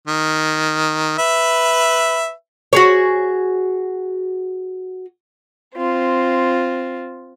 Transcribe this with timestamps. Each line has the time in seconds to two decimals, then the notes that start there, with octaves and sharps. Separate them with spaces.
0.08 D#3
1.18 B4 E5
2.73 F#4 G#4 C#5
5.74 C4 F4